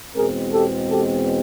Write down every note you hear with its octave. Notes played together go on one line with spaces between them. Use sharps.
E2 B2 G#3 C4 G#4 A#4
G4 A4
G4 A4